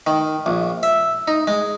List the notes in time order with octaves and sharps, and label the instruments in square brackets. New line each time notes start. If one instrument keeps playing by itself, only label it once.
[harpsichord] D#3
A#1
E5
D#4
G#3